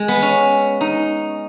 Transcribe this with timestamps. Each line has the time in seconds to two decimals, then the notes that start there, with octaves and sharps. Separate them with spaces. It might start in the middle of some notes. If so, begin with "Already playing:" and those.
Already playing: G#3
0.08 B3
0.22 C#4
0.81 D#4